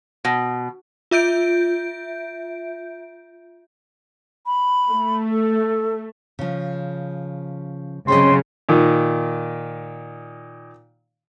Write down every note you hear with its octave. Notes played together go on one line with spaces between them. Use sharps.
B2
F4 E5 G6 D7
B5
A3
A4
C#3 F3
C#3 F#3 C4 C5 D#5 C6
A#2 D#3